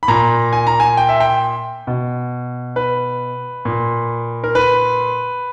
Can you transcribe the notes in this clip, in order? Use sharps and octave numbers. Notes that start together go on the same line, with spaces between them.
B5
A#2 A#5
G#5
A#5
G#5
G5
E5
G5
B2
B4
A#2
A#4
B4